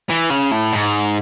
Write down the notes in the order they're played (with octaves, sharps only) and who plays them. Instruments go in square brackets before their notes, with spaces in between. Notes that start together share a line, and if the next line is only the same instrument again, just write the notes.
[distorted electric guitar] E3
C#3
A2
G#2